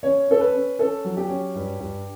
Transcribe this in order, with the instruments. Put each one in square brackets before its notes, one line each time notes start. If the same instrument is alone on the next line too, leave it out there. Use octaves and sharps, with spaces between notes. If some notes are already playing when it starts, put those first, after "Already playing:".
[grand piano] C#4 C#5
C#4 A4
B4
C#4
C#4 A4
F#3
G4
C#4
G2
G2